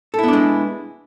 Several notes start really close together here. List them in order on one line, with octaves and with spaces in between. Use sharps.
A4 E4 B3 D4 G#3